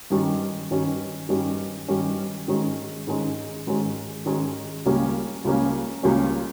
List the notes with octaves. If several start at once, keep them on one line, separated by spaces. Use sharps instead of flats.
G2 D#3 G3 C#4
G2 D#3 G3 C#4
G2 D#3 G3 C#4
G2 D#3 G3 C#4
G#2 D#3 G#3 C#4
G#2 D#3 G#3 C#4
G#2 D#3 G#3 C#4
G#2 D#3 G#3 C#4
C#2 C#3 G3 A#3 C#4
C#2 C#3 G3 A#3 C#4
C#2 C#3 G3 A#3 C#4